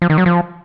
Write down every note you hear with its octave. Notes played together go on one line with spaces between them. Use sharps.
F3
D#3
F#3
F3